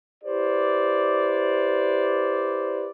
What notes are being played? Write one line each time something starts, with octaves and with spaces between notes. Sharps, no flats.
E4 G4 B4 C5 D5